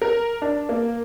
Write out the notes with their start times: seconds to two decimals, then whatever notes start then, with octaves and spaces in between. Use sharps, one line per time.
0.02 A#4
0.42 D4
0.69 A#3